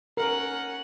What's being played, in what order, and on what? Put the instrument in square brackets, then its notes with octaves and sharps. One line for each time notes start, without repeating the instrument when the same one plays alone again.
[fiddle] C#4 F#5 [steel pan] A#4